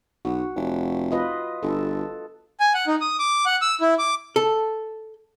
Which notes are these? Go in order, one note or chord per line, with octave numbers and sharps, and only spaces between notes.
B1 F#4
F1
F4 B4 D#5
G1 A4
G#5
F#5
D#4
D#6
D6
F#5
E6
E4
D6
A4